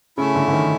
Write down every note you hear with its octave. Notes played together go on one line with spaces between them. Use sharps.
C#3 A3 C#4 E4
D3
D3
D#3